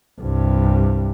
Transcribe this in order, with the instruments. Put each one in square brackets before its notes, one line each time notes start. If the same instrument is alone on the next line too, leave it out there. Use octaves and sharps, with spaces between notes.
[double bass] C2 G2